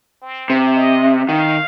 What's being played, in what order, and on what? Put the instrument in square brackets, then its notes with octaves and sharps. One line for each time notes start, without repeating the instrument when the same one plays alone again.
[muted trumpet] C4
[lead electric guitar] C3
[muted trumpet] D#5
[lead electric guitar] D#3 [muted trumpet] F5